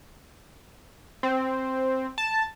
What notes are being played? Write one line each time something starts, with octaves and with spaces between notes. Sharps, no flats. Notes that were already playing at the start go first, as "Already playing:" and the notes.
C4
A5